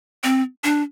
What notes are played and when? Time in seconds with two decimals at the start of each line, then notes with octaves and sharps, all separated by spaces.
0.24 C4
0.64 D4